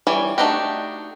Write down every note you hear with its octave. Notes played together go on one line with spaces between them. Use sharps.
E3 G3 C#5 D5
A3 D4 D#4 F#4 G4